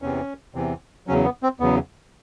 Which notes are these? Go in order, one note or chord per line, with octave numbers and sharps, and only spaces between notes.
E2 C3 E3 C#4
E2 C3 E3
E2 C#3 F#3 C#4
B3
C4
E2 C#3 F#3 B3